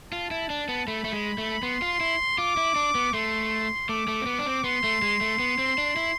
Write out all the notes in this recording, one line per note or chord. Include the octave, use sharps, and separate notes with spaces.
F4 A5
E4
D4
B3
A3 B5
A3
G#3
A3
B3 C6
F4
E4
F4 D6
E4
D4
B3
A3 C6
A3 D6
A3
C4
B3
D4
C4
B3 C6
A3
G#3
A3
B3
C4
D4
E4